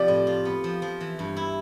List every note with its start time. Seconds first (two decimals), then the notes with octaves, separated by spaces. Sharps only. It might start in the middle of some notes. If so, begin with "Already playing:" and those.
Already playing: C3 F3 F4 G4 D5
0.08 A2
0.27 F4
0.45 B3
0.64 F3
0.82 F3
1.01 E3
1.19 G2
1.37 E4